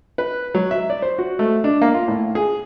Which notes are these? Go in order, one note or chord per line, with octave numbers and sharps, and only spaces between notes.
B4
F#3
E5
D5
C5
F#4
A3
D4
A#3
F4
A2
G#4